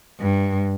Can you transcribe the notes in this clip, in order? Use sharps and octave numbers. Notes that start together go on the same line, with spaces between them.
G2